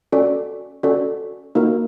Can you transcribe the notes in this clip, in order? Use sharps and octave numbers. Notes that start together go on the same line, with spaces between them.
C#4 F#4 A4 D5
C#4 F#4 A4 D5
A#3 D#4 F#4 A#4